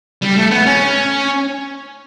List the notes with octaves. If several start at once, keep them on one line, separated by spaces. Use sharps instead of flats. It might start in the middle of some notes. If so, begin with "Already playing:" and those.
G3
A3
B3
C#4